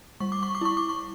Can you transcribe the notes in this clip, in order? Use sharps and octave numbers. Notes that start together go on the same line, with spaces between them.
G3 C#6
D6
C#6
D6
E4 C#6
D6
C#6